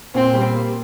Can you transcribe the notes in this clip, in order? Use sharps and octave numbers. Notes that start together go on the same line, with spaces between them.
A#2 C4
G3
A#3